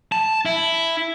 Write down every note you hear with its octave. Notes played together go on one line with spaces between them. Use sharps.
A5
E4